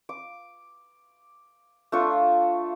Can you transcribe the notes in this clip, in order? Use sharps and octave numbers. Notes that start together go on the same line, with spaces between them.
D6
A3 D4 F4 C#6